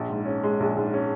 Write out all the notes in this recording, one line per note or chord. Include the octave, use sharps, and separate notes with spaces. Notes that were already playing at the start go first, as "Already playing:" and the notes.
Already playing: A#1
G#2
C#4
G#3
A#1
G#2
C#4